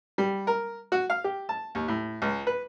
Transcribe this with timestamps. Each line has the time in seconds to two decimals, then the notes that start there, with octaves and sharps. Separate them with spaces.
0.18 G3
0.47 A#4
0.92 F#4
1.10 F5
1.24 G4
1.49 A5
1.75 D#2
1.88 A2
2.22 C#2
2.47 B4